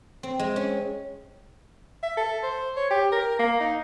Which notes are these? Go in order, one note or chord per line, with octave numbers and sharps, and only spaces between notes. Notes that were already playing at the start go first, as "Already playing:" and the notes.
C4
G#3
C#4
E5
A4
C5
C#5
G4
A#4
A#3
D#4